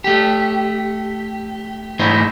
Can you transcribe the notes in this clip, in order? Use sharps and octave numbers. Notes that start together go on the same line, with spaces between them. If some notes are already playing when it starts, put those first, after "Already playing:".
A3 G4
G#2 E3 A3 E4 C5 D#5